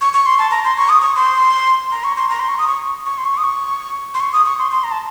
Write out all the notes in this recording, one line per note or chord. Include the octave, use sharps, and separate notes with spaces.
C#6
C#6
C6
A5
A#5
C6
C#6
D#6
C#6
C6
A#5
C#6
C6
A#5
C6
C#6
D#6
C#6
C#6
C6
C#6
D#6
C#6
C6
C#6
D#6
C#6
C6
C6
A#5
A5